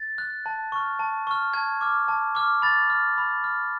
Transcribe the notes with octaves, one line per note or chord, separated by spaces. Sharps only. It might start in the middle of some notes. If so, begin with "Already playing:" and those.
Already playing: A6
F#6
A5
C#6 F6
A5
C#6 F6
A5 G#6
D6 F6
A5
D6 F6
B5 A6
F6
B5
F6